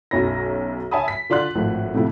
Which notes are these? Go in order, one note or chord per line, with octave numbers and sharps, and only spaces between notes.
B1 F#2 C#5 B5 A#6
C#5 E5 G#5 A5 B5 D#6
B6
D3 F4 D5 C6 F#6
G#1 A2 F3
F2 A2 C3 E4 F4